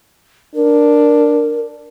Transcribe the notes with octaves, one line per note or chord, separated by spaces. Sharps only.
D4 A#4